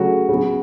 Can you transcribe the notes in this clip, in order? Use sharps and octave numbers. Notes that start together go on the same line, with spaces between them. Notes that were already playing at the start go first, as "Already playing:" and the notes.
Already playing: C#3 F#3 A3 F#4
C#3 F#3 B3